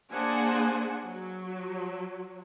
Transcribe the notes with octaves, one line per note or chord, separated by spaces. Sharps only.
A#3 D4 G#4 C5 F#5 G#5
F#3